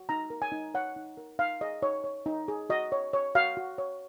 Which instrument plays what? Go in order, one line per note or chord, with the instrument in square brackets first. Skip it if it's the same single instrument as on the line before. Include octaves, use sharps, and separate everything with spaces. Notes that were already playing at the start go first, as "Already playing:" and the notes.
Already playing: [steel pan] F#4
D#4 A#5
A#4
G#5
D#4
C#5 F#5
D#4
A#4
D#4 F5
G#4 D#5
D#4 C#5
C#5
D#4
G#4
F#4 D#5
C#5
C#5
F#4 F5
F#4
C#5